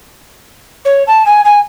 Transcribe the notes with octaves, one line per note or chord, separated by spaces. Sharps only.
C#5
A5
G#5
G#5